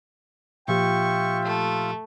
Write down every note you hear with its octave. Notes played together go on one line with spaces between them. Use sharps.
A#2 F3 F4 G4 E5 G5 C#6
A3